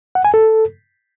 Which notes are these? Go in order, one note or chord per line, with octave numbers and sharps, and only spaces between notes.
F#5
G#5
A4